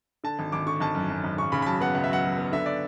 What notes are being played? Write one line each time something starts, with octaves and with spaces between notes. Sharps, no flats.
D3 A5
G#1
G#1 D6
D3 C#6
G#1 A5
F#2
F#2
G#1
C#3 C#6
C#3 B5
B5
F#3 A5
B3 F#5
C#2 F#5
E5
F#3 F#5
F#3
B3
D3 E5
D5